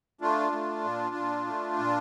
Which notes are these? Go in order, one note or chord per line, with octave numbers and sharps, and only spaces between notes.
A3 D4 F4
A3
A#2
A#2
A3
A#2